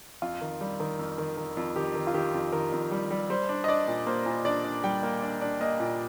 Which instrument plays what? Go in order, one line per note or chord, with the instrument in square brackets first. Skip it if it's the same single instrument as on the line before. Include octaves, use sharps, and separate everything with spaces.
[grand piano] F2 F4
D#3
G3
D#3
F2
D#3
D#3
F2
D#3 G4
D#3
F4
D#3 G4
F2
D#3 A#4
F2
G3
G3
G3 C5
D4
D#5
D4 D5
A#2
A#3 C5
A#2
D4 D5
D4
G3 G5
A#3
D4
D4
A#3 D#5
A#2